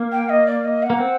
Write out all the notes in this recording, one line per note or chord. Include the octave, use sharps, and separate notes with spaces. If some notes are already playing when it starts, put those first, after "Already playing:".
Already playing: A#3
G5
D#5
D5
D#5
F#5
A#3
C4